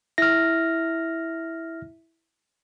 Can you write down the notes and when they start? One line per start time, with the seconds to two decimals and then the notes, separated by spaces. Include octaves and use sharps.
0.18 E4 E5 F6 A#6